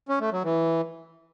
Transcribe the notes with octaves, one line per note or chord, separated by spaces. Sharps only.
C#4
A3
F#3
E3